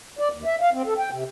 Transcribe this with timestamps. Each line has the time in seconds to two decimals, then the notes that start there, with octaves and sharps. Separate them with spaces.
0.19 D5
0.32 D#2
0.45 E5
0.61 F5
0.74 C4
0.86 A4
0.98 G5
1.10 C3